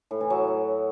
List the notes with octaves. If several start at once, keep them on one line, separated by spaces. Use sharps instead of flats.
A2
E3
F#3